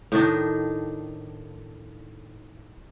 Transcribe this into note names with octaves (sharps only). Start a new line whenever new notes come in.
A2 D#3 D4 D#4